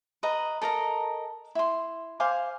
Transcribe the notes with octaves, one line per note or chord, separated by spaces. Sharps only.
B4 D#5 A#5
A4 A#4 D#5 A#5
E4 C6
C5 F5 G#5 D6